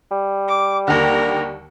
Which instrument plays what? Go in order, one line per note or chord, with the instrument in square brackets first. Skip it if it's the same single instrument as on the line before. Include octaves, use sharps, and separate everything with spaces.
[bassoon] G3
[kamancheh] D6
[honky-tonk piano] D#2 D3 [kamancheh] A#4 A#5